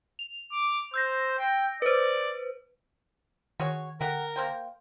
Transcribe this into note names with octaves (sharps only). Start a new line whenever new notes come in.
F7
D6
C5 E6 G6 A#6
G5
B4 C5 D5
D#3 F#4 G#4 C#5
D3 G4 A#4 F#5
A#3 C5 G5